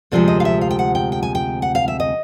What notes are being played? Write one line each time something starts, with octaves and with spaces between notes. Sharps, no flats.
D2 C3 F3 G#3 D5
D#5
F5
E5
F5
G5
F#5
G5
G5
G#5
G5
F#5
F5
E5
D#5